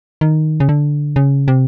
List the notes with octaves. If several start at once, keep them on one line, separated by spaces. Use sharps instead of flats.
D#3
C#3
D3
C#3
C3